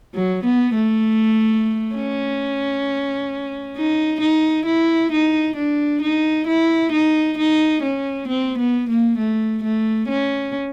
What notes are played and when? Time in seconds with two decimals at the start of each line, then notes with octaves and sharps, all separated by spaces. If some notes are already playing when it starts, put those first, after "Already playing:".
0.15 F#3
0.45 B3
0.75 A3
1.95 C#4
3.77 D#4
4.21 D#4
4.66 E4
5.12 D#4
5.56 D4
6.02 D#4
6.47 E4
6.92 D#4
7.38 D#4
7.83 C#4
8.28 C4
8.59 B3
8.89 A#3
9.18 A3
9.64 A3
10.09 C#4